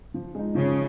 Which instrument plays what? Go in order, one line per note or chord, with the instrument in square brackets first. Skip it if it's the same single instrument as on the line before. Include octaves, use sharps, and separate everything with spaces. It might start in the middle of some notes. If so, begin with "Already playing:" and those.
[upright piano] F3
G#3 D#4
[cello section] C#3 [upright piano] F3